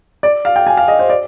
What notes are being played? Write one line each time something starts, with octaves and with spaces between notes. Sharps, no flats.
D5
F5
G5
G#5
F5
D#5
C5
D5